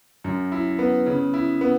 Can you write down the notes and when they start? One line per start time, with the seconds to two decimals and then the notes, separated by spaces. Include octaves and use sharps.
0.24 F#2
0.52 E4
0.79 B3
1.06 C#3
1.34 E4
1.61 B3